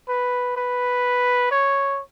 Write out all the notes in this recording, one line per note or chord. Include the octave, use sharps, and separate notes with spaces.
B4
B4
C#5